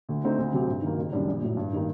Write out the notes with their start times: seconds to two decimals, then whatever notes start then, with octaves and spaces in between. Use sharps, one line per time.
0.09 D2
0.24 D3 A3 C4 D#4
0.38 D2
0.53 C3 F#3 C4 G4
0.68 G2
0.82 D#3 F#3 A#3
0.98 F#1
1.12 F#2 D#3 G3 D4
1.28 A#1
1.42 A2 F#3
1.57 G2
1.73 D#3 G3 A#3 D#4